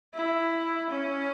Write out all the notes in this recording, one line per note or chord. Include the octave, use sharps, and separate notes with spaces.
E4
C#4